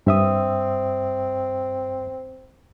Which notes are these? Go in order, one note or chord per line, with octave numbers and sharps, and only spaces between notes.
G2 C4 E5 D#6